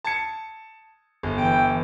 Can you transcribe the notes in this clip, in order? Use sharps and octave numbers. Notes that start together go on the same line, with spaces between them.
A5 G#6 C#7
G1
E3 G5